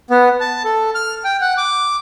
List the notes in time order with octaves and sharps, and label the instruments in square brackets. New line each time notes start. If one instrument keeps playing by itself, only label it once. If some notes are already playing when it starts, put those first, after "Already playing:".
[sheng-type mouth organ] B3
A5
A4
F6
G5
F#5
D6